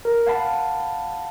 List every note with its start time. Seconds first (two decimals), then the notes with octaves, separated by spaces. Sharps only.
0.05 A#4
0.27 F5 F#5 A5 B5